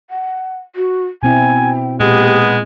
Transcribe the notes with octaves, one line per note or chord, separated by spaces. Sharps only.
F#5
F#4
B2 C4 E4 G5 G#5
A#2 G#3 B3 G4